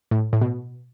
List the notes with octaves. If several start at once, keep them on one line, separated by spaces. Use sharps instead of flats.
A2
A2
B2